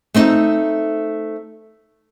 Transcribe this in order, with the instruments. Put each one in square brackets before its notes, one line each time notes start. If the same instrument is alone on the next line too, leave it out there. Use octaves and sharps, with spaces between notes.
[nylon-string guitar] A3 C4 D#4